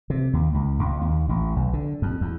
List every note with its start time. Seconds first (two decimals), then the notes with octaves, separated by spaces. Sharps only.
0.10 C3
0.33 D#2
0.54 C#2
0.79 C#2
1.01 D#2
1.29 A1
1.56 B1
1.73 D3
2.02 F2
2.21 E2